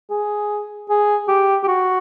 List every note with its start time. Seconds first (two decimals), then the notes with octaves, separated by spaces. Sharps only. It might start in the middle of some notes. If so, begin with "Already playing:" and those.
0.10 G#4
0.90 G#4
1.28 G4
1.63 G4
1.68 F#4